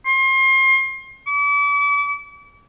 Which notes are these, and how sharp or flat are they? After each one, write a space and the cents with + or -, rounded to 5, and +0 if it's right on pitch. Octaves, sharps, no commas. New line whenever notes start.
C6 +35
D6 -40